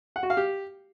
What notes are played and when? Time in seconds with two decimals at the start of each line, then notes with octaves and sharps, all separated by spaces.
0.16 F#5
0.23 F#4
0.30 F5
0.37 G4